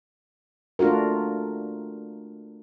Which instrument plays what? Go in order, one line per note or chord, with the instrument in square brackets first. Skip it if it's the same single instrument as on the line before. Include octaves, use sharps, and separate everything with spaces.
[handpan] A3 D4 F4 F#4 A#4